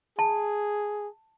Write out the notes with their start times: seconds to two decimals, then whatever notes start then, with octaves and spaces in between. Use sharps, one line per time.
0.19 G#4 A5